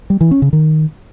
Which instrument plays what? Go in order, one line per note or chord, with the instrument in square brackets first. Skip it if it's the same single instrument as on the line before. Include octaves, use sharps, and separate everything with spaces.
[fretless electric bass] G3
E3
C#4
C#3
D#3